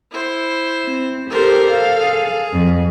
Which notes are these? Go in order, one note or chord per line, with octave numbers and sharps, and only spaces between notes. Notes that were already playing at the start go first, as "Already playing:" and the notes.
E4 C5
C4
G4 A4 A#4 C5
A4 F5
G#4
F2